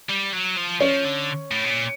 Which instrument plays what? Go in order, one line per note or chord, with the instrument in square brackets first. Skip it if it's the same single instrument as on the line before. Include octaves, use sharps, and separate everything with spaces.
[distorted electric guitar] G3
F#3
F3
[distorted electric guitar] F3 [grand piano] C#4
[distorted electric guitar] D3
A2
B2
A#2